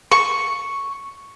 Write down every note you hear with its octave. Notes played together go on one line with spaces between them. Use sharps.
C#6